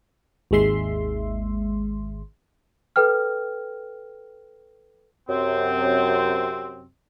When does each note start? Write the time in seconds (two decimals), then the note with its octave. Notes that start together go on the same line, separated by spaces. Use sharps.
0.51 G#1 D#2 G#3 E5 C6
2.96 A4 B4 G5 F6
5.29 F#2 C3 C4